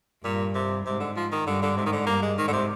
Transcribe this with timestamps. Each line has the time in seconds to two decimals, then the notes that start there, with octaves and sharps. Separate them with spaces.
0.24 G2 A#2
0.55 C3
0.86 G#2 C3
1.00 D3
1.16 F3
1.32 D#3
1.46 G2 D3
1.62 D3
1.77 G#2 C3
1.86 D#3
1.92 D3
2.07 G2 A#3
2.22 G#3
2.38 G#2 D#3
2.48 D3
2.53 C3